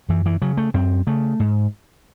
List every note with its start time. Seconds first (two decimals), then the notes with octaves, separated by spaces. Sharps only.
0.09 F#2 E3
0.26 E3
0.42 C#3 F#3
0.57 A3
0.74 F#2 C4
1.07 C#3 A3
1.40 G#2